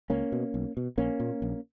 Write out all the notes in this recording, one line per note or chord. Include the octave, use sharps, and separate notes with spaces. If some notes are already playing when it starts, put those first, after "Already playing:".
C#2 A#3 C#4
B2
B1
B2
A#1 A#3 C#4
A#2
A#1